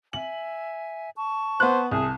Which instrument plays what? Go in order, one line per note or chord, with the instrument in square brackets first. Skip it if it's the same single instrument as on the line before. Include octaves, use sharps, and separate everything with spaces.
[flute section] E5 G#5 [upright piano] F#7
[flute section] A5 C#6
[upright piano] B3 F#6 [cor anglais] C5
[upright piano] C2 [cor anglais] G#4 [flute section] A5